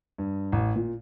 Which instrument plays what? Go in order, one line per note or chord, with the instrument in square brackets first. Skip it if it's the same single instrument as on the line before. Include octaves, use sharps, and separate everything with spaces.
[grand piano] G2
A1
A#2